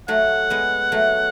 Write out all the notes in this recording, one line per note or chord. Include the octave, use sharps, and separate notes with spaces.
F#3 A3 F#5
G#3 B3
F#3 A3